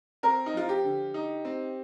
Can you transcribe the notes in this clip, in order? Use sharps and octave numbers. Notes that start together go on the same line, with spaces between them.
C4 A#4
D#4
F3 F4
G4
D3
D#4
C4